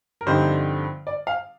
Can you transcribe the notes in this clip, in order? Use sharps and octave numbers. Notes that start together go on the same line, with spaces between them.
A#4
G2 D3 F3 C4 D#4 C5
D5
F5